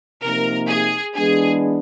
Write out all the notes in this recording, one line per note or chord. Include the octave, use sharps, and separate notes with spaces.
C3 F3 A#3 D#4 A#4
G#4
E3 G#3 B3 D4 G#4